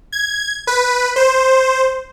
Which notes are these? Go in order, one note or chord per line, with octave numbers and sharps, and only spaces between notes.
G#6
B4
C5